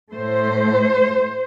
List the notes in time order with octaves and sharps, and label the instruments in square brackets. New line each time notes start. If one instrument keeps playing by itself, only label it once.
[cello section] A2 A3 C5